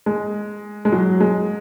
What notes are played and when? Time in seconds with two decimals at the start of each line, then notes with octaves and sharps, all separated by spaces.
0.06 G#3
0.85 G#3
0.92 F#3
1.20 G#3